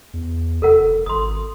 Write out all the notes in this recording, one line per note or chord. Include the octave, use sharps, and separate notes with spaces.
E2
F1 A4 A#4 F#5
G#1 C6 D#6